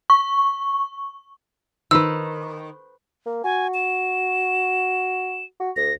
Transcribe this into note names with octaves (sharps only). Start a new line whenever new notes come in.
C#6
D#3 B4 C5 E6
A#3
F#4 G#5
E7
F#4
D2 A#6